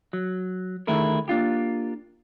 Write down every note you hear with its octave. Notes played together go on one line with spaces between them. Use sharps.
F#3
D3 D#3 A3 E4 G#4 A#4
A#3 D4 F4 G4